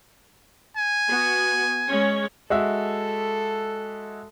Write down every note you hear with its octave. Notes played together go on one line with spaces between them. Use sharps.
G#5
B3 F#4
G#3 C#4 C#5
G#3 F#4 A4 E5